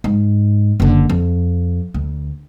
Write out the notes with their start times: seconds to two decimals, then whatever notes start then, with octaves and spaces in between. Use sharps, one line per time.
0.04 G#2
0.80 F#1 D3
1.10 F2
1.94 D2